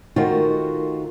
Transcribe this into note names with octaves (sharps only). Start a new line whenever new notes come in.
D#3 A3 F4 F#4 A#4 C5